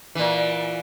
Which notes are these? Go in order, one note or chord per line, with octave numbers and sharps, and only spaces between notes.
A#2 E3